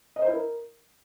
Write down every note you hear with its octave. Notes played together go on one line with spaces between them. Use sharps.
D#5
C5
E4
A#4